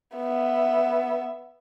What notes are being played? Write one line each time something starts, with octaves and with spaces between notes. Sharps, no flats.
B3 E5